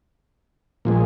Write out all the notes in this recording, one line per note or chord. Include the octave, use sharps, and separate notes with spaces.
A#2 F3 G#3